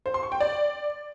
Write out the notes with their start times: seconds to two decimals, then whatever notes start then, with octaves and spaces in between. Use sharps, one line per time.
0.06 C5
0.14 C6
0.23 C#6
0.32 G5
0.40 D5